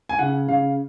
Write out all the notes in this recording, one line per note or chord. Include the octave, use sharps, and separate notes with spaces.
G#5
C#3 F#5
C#3 F5